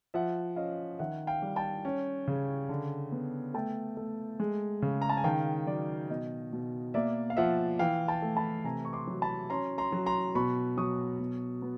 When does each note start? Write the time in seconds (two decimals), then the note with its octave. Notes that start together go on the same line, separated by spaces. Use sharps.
0.14 F3 E5 F#5
0.56 C#4 D#5 F5
0.99 D#3 E5 F#5
1.27 F5 G5
1.42 G3
1.56 G5 A5
1.85 C#4
2.27 C#3
2.69 D3
3.12 B3
3.54 A3 G5 A5
3.97 A3
4.40 G#3
4.82 C#3
5.02 A#5
5.10 A5
5.17 G#5
5.24 D#3 F5 G5
5.67 F#3 D5
6.10 B2 D#5
6.53 B2
6.94 A#3 D5 E5
7.30 F5
7.37 F3 E5 F#5
7.79 E3 F5 G5
8.08 G5 A5
8.22 A3
8.37 A5 B5
8.64 C3 G#5 A#5
8.85 C#6
8.93 C6 D6
9.08 F#3
9.22 A5 B5
9.50 C#4 A#5 C6
9.78 A#5 C6
9.92 F#3
10.06 A#5 C6
10.35 B2 B5 C#6
10.77 F#3 C#6 D#6
11.19 B2
11.62 B3